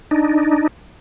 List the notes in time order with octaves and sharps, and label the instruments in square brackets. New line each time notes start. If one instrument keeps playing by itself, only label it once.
[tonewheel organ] D4 D#4